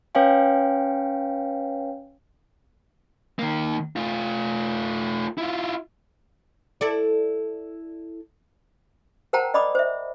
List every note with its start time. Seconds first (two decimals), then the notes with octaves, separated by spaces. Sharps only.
0.15 C#4 B4 C#5 F5 G5 G#5
3.39 D#3 A#3
3.96 A3 F4
5.38 E4 F4
6.81 E4 A4 D5
9.33 A#4 C5 F#5 G5 A5 A#5
9.54 D5 D#5 B5 D6 D#6
9.75 C5 E5